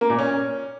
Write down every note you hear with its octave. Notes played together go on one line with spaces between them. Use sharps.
A#3
A#2
C#4